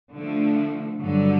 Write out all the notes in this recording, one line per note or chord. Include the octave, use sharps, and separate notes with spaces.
D3 F3 A3
G2 D3 F#3